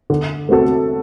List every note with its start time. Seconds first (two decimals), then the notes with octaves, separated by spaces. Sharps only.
0.10 D3
0.49 A3 C4 F#4 A4